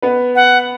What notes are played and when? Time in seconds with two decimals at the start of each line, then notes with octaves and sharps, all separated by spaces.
0.02 B3 B4
0.35 F#5